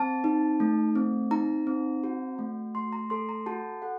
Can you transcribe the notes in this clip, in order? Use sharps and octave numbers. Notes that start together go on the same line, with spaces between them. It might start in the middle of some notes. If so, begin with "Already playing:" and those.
Already playing: C4 A5
D#4
A3
C4
D#4 A#5
C4
F#4
A3
A3 C6
A#5
A4 C6
A#5
F#4 A5
A4 F#5